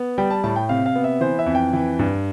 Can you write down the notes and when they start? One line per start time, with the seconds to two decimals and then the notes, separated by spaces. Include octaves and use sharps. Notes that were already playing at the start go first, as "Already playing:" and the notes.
Already playing: B3
0.18 G3 G5
0.30 A5
0.44 A2 A5
0.56 G5
0.69 C3 F5
0.86 F5
0.95 B3
1.04 E5
1.21 E3 C5
1.39 E5
1.46 F2
1.55 G5
1.73 E3
1.99 G2